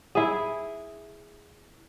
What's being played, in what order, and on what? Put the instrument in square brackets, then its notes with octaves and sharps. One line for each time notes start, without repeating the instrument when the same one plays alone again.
[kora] E4 G#4